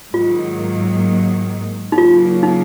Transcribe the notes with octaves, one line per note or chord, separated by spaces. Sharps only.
G#2 D#3 F#3 A#3 F4
D#4
C#3 F#3 A#3 F4
D#4